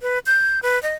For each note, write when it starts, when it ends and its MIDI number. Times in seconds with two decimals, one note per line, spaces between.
0.01 0.19 71
0.26 0.59 91
0.63 0.81 71
0.83 0.95 75